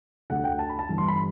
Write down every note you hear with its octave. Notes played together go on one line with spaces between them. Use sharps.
D2 D3 F#5
G5
A5
B5
A5
G1 G2 E3
C6
B5